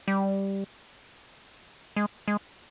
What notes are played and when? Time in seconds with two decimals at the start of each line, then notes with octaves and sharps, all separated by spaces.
0.08 G3
1.96 G#3
2.28 G#3